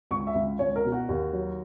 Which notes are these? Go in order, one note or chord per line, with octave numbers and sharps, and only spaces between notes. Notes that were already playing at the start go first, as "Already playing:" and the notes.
C#2 C#6
E5
C#2
C#2 C#5
A#4
B2
F#4
D#2
F#3